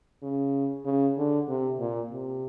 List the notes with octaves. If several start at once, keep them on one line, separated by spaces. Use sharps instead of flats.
C#3
C#3
D3
C3
A#2
C3